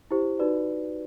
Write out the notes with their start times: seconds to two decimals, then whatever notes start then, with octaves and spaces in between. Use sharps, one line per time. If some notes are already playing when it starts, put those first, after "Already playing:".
0.11 E4 G4 C5
0.39 D#4 F#4 B4 D5